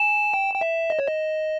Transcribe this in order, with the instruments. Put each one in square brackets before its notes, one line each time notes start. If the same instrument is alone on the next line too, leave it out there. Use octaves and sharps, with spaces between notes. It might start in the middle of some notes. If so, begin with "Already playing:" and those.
Already playing: [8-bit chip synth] G#5 [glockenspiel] E7
[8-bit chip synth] G5
G5
E5
D#5
C#5
D#5